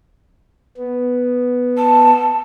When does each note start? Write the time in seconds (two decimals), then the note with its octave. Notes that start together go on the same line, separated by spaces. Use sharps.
0.78 B3
1.77 A5